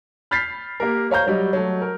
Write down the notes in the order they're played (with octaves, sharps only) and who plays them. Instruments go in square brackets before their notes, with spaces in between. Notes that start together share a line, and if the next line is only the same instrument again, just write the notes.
[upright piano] B5 F6 G6 A6 B6 C7
A#3 G4 A#4
C5 C#5 F5 A#5 G6
F#3 G3 D#5
F#3 A3
A#4